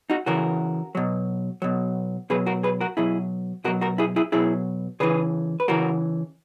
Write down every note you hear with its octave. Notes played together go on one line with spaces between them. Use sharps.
D#4 F#4
C#3 E3 F#4 A#4
B2 F#3
B2 F#3
B2 F#3 G#4 B4
F#4 A#4
G#4 B4
F#4 A#4
B2 F#3 E4 G#4
B2 F#3 F#4 A#4
F#4 A#4
E4 G#4
E4 G#4
B2 F#3 E4 G#4
C#3 E3 G#4 B4
B4
C#3 E3 F#4 A#4